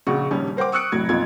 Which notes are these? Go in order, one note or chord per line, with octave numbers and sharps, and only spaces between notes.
A#1 C#3 F#4 C#6
D#1 A#1 D#2 G3 C#4
A#4 C5 F#5 G5 D6
C#6 D#6 E6 F#6 C#7 D7
F1 A2 F#3 G#6
B1 F2 A#2 F4 G#6